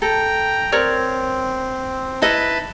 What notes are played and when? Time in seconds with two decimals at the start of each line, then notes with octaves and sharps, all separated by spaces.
0.02 A4 G5 A#5
0.72 C4 A#4 C#5 D5
2.22 D#4 E4 B4 D#5 A5 B5